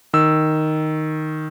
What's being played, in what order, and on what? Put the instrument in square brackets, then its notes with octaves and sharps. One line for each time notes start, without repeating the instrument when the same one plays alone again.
[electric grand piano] D#3 E6